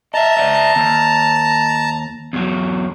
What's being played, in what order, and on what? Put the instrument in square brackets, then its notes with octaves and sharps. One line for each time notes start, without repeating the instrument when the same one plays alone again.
[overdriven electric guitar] D#5 E5 [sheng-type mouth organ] A5 A#5
[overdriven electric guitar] D5 E5
D#2
E2 F#3